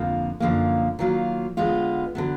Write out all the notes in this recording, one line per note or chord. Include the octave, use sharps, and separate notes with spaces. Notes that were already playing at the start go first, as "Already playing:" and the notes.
Already playing: F2 D3 F3 A#3
F#2 D3 F3 A#3
D#3 F#3 A#3 F4
D3 G#3 B3 F4
D3 F#3 B3